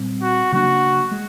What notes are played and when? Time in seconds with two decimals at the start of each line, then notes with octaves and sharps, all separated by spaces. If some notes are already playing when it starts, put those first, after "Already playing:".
Already playing: A#2 G3 C4
0.22 F#4
0.52 C#3 F#3 A#3 D4 F#4
1.11 G#3